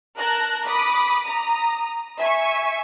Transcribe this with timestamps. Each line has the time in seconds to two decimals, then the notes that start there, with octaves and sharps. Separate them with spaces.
0.19 A#4 A5 F#6 A#6
0.65 B5 D6 D#6
1.23 A#5 D#6
2.19 E5 G#5 C#6